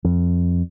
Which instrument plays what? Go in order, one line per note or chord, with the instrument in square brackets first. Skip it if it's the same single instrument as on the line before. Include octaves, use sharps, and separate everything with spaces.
[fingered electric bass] F2